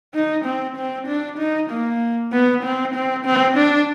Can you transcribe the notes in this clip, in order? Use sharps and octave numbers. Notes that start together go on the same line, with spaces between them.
D#4
C4
C4
D4
D#4
A#3
B3
C4
C4
C4
D4